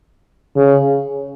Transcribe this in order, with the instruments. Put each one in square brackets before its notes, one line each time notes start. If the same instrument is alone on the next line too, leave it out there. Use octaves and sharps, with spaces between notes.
[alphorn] C#3